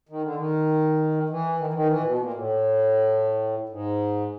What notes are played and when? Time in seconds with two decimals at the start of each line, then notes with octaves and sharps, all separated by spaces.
0.09 D#3
0.22 D3
0.35 D#3
1.29 E3
1.59 D#3
1.67 E3
1.74 D#3
1.88 E3
2.00 A#2
2.04 B2
2.19 A#2
2.34 A2
3.69 G#2